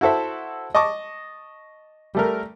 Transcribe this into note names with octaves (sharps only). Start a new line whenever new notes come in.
E4 F#4 A4 C5 E5
D#5 A5 C#6 D6
G3 A3 A#4